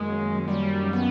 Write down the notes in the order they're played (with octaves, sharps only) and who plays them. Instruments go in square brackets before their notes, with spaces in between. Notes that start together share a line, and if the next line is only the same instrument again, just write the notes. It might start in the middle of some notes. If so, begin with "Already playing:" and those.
Already playing: [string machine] F#2 D#3 F#3 A#3 C#4 [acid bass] G#3
[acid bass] G3
B3